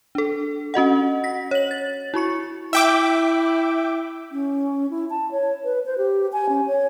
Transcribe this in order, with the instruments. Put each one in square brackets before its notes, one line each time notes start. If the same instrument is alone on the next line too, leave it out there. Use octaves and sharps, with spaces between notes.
[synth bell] D4 A4
C#4 F#4 D#5 F#5
A#6 B6
C#5 F#7
A6
E4 F#4 C#6 C#7
[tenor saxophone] E4 [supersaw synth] E5 G5 D6
[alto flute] C#4
E4
A5
C#5
B4
C5
G4
G#5
C#4
C#5